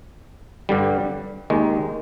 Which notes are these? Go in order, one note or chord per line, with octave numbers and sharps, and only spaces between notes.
G2 D3 G3
D#2 D#3 G#3